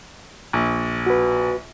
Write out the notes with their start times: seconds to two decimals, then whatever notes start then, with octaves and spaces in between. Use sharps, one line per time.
0.53 A#1
1.06 F#4 B4